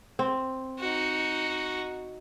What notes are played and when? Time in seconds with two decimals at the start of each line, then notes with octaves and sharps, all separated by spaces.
0.19 C4
0.79 D#4 F#4